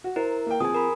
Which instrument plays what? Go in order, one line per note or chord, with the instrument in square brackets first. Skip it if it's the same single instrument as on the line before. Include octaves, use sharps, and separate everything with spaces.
[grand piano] F#4
[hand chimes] E4 A#4 [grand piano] C5
[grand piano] A#3 G5
[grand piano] F3 C4 G#4 [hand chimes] G#5 D#6
[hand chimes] A#4 B5